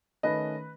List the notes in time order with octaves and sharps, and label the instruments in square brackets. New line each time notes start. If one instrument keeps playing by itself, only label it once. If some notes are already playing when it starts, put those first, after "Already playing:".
[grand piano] D#3 A3 C#4 B4 D#5